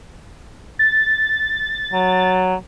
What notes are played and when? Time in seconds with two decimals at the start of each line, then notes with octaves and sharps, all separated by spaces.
0.79 A6
1.93 F#3